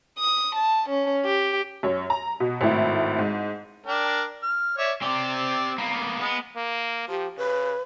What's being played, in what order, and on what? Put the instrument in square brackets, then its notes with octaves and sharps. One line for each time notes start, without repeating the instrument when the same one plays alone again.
[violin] D#6
A5
C#4
G4
[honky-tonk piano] F#2 C#5
A#5
B2
G#1 A2 E4
G#2
[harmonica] D4 A#4 G5
F6
C#5 D5 E5
[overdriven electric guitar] C4 G4 [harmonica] D5
[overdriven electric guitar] A#3 B3
[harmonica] G#3 [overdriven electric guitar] B3
[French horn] A#3
[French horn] F3 [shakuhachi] G4
[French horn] C#3 [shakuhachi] B4